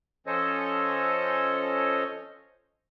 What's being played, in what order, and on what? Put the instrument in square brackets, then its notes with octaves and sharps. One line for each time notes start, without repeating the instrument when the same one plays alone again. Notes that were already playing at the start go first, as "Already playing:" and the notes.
[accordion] F3 C#4 A4 C5 C#5 D#5